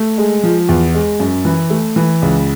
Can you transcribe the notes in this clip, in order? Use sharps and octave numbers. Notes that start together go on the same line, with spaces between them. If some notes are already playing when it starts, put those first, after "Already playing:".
Already playing: A3
G#3
F3
E2
G#3
F#2
E3
A3
E3
C#2